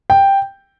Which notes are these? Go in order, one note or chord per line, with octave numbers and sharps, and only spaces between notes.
G5